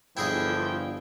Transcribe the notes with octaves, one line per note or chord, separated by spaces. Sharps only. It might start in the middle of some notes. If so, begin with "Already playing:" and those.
G1 D3 E3 F3 E4 G#4 D#5 G5